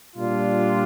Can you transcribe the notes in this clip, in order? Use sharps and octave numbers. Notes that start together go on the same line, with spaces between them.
A#2 G3 D4 F4